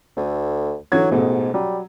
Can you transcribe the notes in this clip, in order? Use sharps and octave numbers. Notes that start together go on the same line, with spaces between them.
D2 A3
D3 E3 F#3 G#6
A1 G#2 B2 A4
F#3 G3